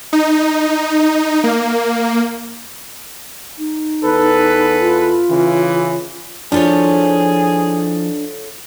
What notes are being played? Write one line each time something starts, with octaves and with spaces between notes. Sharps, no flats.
D#4
A#3
D#4
E2 A4 B4
F4
C#3 E3
F3 D4 E4 F4 G#4 A4 C5 C#5